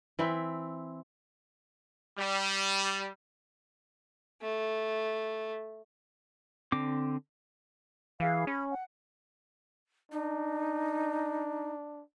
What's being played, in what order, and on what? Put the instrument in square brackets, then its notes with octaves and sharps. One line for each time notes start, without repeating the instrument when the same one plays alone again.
[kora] E3 C4 E4
[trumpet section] G3
[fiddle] A3
[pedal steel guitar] D3 C4 D6
[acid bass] E3 [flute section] G#4 F5
[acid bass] C#4 [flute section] B5
[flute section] F#5
[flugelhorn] D4 [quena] D#4